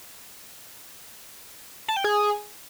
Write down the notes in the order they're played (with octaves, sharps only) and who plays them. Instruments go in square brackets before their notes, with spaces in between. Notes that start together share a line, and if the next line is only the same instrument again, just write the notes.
[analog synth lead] A5
G5
G#4